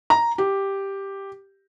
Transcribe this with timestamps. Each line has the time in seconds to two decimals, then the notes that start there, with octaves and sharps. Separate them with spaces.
0.10 A#5
0.38 G4